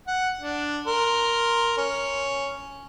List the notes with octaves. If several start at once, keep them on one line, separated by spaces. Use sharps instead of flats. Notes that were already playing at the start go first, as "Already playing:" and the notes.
F#5
D4
A#4 C6
C#4